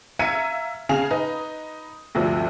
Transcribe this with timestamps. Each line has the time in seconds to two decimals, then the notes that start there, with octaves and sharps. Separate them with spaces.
0.19 E5 F5 A#5 G#6 C#7 D#7
0.89 C#3 G#4 F5 F7
1.11 D#4 B4
2.15 D2 G2 C3 F3 G3